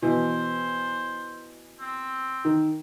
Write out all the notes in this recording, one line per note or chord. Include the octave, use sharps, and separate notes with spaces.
B2 E3 C5
C4
D#3